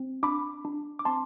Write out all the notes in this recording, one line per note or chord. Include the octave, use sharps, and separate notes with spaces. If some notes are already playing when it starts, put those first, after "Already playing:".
Already playing: C4
D4 B5 D6
D4
D6
C4 A5 C6